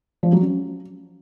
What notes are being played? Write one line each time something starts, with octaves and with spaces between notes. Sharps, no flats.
F3
F#3
C#4